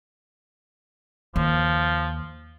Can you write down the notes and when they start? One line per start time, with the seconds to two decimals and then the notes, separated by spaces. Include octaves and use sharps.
1.36 D#2 F3